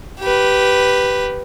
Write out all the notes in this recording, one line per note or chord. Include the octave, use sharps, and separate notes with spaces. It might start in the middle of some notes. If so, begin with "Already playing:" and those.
G4 B4